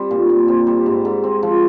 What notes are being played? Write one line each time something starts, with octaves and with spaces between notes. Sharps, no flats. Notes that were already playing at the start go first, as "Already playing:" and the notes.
Already playing: G3 C4
A#2
A#2
C4
G3
G#2
G#2
C4
F3